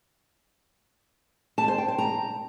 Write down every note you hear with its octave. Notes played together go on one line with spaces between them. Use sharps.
A5
C5
G5
C5
A#5